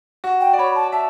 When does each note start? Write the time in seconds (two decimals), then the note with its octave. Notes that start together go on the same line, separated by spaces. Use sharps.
0.24 F#4
0.41 G5
0.53 D5
0.59 C#5 B5
0.75 A5
0.92 E5 A5